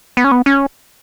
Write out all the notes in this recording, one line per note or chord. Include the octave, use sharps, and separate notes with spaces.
B3
C#4
B3
C#4